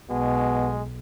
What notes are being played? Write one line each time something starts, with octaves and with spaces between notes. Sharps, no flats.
B1 B2 G#3